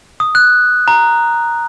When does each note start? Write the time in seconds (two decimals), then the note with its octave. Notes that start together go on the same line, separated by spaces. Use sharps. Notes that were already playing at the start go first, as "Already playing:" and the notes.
0.20 D#6
0.35 F#6
0.88 A#5